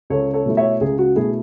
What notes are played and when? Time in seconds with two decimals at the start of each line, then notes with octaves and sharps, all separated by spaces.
0.10 C#2 A4 C#5
0.34 A4 C#5
0.46 B2 A3 E4
0.57 C#5 E5
0.81 C#2 G#4
0.99 F#4
1.16 B2 A3 E4 G#4